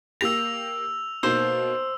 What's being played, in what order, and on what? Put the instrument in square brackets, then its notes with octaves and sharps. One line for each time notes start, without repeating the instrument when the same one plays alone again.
[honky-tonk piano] A#3 G4 A#6 [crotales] E6 F7
[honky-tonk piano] B2 A#3 D#4 [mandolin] C5 [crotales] E6